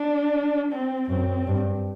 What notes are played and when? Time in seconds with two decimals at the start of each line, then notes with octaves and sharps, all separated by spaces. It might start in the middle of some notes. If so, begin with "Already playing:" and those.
Already playing: D4
0.72 C4
1.09 F#2 C4
1.47 G2